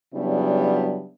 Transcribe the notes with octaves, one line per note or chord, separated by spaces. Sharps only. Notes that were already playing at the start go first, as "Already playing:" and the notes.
C#3 F#3 G3 B3 D4 E4